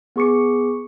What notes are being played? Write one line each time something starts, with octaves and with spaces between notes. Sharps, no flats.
B3 G#4 C#6 D6 C#7